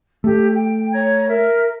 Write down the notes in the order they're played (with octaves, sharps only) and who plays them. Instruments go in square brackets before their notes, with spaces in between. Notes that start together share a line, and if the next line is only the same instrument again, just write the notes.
[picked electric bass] A3 [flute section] G4
[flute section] G5
C#5 A#5 G#6
A#4 E5